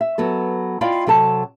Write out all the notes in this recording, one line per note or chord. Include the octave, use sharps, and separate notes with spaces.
E5
F#3 B3 A4
E4 F4 D5 D#5 F5 G5
C3 F#3 A4 A5